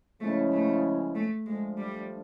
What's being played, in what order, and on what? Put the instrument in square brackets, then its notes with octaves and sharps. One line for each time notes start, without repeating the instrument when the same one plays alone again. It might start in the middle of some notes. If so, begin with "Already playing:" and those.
[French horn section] C#3 F3 G#3 C#4 E4 [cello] A3
[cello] A3
A3
[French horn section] F3 A3 D4 [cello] G#3
[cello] G3